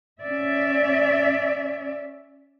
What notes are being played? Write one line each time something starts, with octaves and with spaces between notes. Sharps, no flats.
C#4 D5 E5